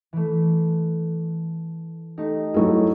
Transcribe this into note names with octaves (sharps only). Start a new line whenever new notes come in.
E3 A3
A3 D#4 G4
F#3 A3 E4 G#4